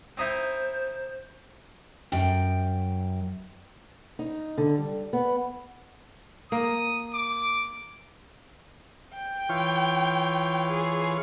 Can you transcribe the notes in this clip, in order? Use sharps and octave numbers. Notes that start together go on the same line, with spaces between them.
C4 D#4 E4 C5
F#2 G5
D#4
D3
G3
B3
A#3 D#6
D6
G5
E3 F4 C#5
G#4